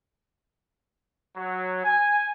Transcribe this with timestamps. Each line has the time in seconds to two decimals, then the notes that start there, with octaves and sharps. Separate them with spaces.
1.37 F#3
1.84 G#5